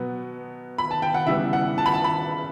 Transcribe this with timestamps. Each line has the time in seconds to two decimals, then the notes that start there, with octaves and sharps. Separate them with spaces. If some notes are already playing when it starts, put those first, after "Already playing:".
Already playing: B2 F#3 B3
0.78 B5
0.91 A5
1.02 G5
1.14 F#5
1.26 C#3 E3 G3 B3 E5
1.53 F#5
1.78 A5
1.86 B5
1.94 A5
2.04 B5